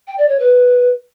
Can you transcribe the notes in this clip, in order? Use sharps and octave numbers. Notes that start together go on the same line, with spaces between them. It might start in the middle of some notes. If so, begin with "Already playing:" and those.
G5
D5
C#5
B4